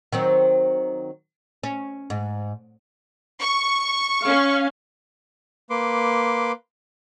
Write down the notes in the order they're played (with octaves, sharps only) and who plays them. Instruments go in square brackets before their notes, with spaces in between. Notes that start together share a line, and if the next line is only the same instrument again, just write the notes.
[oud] D#3 F#3 C4
C#4
G#2
[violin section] C#6
[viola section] C#4 F5
[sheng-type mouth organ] A#3 B4 C6 D6